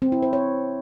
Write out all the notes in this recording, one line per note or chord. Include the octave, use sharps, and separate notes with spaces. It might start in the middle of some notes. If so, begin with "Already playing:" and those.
C4
E4
C5
C#5